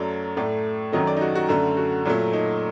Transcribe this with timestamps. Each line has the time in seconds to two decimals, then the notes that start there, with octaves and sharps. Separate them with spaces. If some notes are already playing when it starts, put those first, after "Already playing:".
Already playing: F#2 F#3 A3 D5
0.37 A2 A3 D5
0.92 F#2 D#3 F#3 A3 D#5
1.07 D5
1.17 D#4
1.21 F#4
1.35 F#4
1.49 F#2 D3 A3
1.77 F#4
2.05 A#2 F#3 A3
2.33 D#4